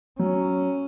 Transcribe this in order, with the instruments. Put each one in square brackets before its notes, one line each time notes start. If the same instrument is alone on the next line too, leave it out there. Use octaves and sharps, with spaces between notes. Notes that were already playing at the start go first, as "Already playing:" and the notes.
[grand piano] F#3 [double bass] C#4